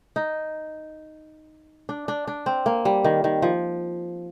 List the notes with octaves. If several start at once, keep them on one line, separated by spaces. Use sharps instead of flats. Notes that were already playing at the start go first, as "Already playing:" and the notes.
D#4
D4
D4
D4
C4
A#3
G3
D#3
D#3
F3